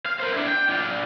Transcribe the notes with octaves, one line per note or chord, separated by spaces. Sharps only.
F5
A#4 C5
D4 E4
G5
D4 F4